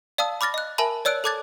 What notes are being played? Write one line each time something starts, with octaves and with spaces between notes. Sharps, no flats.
D5 F5 A5 D#6 E6
B5 D6 F6 A6 A#6
D#5 F#6
A#4 E5 G#5 A5 B5
C#5 D5 E6 F#6 D7
A4 A5 D6 F#6 G#6 A6